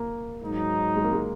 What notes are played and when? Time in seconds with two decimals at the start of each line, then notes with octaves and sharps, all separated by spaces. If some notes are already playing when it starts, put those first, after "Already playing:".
Already playing: A#3
0.41 G#2 F#3 D#4
0.96 G#3
1.04 A#3
1.13 G#3